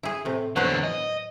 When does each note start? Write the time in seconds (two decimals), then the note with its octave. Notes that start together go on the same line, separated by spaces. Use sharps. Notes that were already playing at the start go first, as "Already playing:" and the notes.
0.03 E4 G#4
0.25 A2 C3
0.56 E2 D3 F#3 B4 C5
0.84 D#5